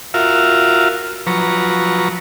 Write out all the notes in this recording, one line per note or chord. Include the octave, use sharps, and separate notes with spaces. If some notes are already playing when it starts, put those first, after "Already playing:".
F4 F#4 A#4 E5 F5
F3 F#3 B4 A#5 C#6